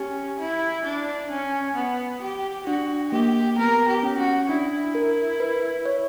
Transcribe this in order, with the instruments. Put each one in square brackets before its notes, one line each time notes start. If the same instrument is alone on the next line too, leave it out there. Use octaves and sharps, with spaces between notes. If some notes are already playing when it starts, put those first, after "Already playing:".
Already playing: [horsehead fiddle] C#4 [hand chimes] G4
[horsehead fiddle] E4
D4
C#4
B3
G4
[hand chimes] D4 [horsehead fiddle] F#4
[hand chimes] A#3 [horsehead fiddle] G4
[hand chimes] B3 [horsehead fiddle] A#4
[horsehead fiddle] G4
[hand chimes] C#4
[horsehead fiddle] F#4
[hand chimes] D4 [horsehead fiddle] E4
[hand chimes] A#4
B4
C#5